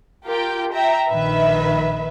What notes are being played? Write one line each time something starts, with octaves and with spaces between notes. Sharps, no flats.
F4 G4 A#4 G5
E5 G5 A#5
A#1 D#3 B4 E5